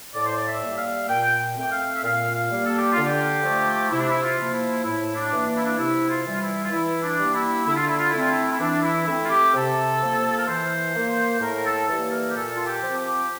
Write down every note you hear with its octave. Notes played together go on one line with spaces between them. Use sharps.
A2 D5
C5
D5
E5
G3 A#3
F5
A#2 G5
A3 C4 G5
F5
E5
A#2 F5
F5
G3 A#3
A4
G4
D3 F4
G4
F3 A3
C3 E4
D4
E4
F4
F3 A#3
E4
A2 E4
D4
E3 A#3
D4
E4
D4
C3 E4
F4
E3 G3
F4
E4
F4
E3 E4
D4
G3 A#3
E4
D3 E4
F4
E4
F4
A3 C4 E4
F4
E4
E4
E3 D4
E4
A3 C4 E4
F4
G4
C3 A4
F3 A#3
A#4
E3 C5
A#3
A2 A#4
A4
E3 G3 A#3 A4
A#4
G4
A#2 A4
F4
G4
F3 C4
G4